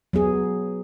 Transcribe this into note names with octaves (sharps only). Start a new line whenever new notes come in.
F#3 B3 G#4